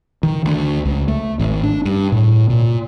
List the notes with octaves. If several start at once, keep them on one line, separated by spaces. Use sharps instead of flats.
D#3
D2
C#2
A3
G#1
D4
G2
A2
A#2